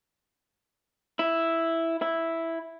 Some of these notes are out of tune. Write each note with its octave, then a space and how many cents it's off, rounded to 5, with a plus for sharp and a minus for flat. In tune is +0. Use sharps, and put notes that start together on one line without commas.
E4 +0
E4 +0